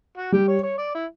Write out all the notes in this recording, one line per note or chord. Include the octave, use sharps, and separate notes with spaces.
F#4
G3 G4
C#5
C#5
D5
E4